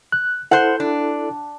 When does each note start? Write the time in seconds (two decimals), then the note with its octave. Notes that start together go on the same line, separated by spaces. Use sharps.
0.12 F#6
0.51 E4 A4 C5 F#5
0.80 D4